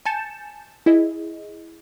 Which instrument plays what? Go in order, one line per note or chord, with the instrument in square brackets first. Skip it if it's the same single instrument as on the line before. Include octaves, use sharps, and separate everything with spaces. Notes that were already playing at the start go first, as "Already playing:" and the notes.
[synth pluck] G#5 A5 G6 A6 C#7 E7
E4 G#4 D#5